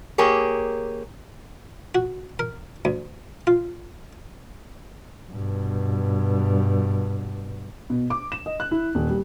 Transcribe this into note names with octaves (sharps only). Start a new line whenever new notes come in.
A#3 G4 G#4 A#4 C#5
F#4
A#4
D2
F4
G2 B2
B2
D6
E7
D#5
F#6
E4
D#1
G3